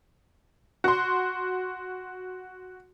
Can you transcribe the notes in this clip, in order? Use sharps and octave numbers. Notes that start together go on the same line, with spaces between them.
F#4 C6